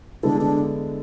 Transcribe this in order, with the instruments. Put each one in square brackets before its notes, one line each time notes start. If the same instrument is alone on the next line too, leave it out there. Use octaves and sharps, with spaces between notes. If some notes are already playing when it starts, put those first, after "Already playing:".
[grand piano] D3 G#3 B3 E4 A4 [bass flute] D4
[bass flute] D4